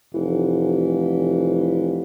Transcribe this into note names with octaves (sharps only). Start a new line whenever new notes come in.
F1 E3